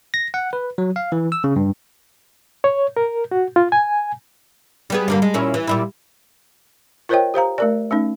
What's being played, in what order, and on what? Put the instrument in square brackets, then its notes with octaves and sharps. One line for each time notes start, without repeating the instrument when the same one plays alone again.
[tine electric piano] A#6
F#5
B4
F#3
F5
E3
E6
C#3
G2
[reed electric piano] C#5
A#4
F#4
F4
G#5
[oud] G3 B3 G#4
G2 D3 A#3
G#3
A#2 C#4 E4
E3
A#2 G3 E4
[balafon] F4 A#4 C5 C#5 D#5 G5
G4 C5 F5 A#5
A3 A#4 D5
A3 C#4 D#4